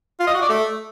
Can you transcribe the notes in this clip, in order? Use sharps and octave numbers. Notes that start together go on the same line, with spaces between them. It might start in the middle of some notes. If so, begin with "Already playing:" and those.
F4
D#5
F#4
D5
A3